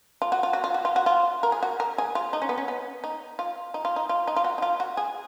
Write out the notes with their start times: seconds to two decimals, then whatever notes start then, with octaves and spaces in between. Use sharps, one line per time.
0.22 F4
0.32 F#4
0.43 F4
0.53 F#4
0.64 F4
0.74 F#4
0.85 F4
0.96 F#4
1.06 F4
1.43 A#4
1.52 G#4
1.63 F#4
1.80 A#4
1.98 G#4
2.15 F4
2.33 D#4
2.42 C#4
2.49 B3
2.58 C#4
2.68 B3
3.04 D#4
3.39 F4
3.74 D#4
3.85 F4
3.96 D#4
4.09 F4
4.27 D#4
4.36 F4
4.44 F#4
4.58 D#4
4.62 F4
4.80 F#4
4.97 G#4